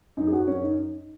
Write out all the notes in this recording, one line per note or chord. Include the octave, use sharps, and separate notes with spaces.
F#2 D#4
G#4
F#4
F#2 C#4
D#4